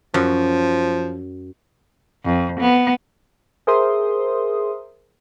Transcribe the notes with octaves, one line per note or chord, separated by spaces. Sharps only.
F#2 F3
F2
B3
G#4 A#4 C5 E5 C6 D#6